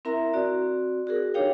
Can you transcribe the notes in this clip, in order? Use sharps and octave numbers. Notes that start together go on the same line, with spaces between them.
C4 E4 A#4 E5 A#5
C4 F#4 D5
F#4 G#4 A#4
D4 D#4 G4 C#5 F5 G5